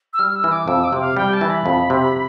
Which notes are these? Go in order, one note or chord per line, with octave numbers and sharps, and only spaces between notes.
E6
G3 F6
E6
E3
D6
F2 E6
D6
C3
F5
G3 G5
A5
E3
B5
F2
C3